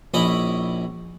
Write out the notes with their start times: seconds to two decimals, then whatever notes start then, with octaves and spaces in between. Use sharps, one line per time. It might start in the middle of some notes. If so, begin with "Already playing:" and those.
0.14 A#1 C#4 E4 D#5 B5